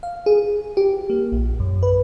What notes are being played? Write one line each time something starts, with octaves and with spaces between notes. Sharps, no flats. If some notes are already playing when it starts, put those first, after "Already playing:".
F5
G#4
G4
A#3
A#1
F#2
B4